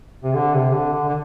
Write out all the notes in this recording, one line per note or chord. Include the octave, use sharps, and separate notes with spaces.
C3
D3
C3
D3
D3
D3